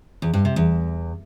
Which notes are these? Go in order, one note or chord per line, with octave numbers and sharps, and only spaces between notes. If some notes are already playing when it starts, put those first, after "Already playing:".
E2
G2
C3
E2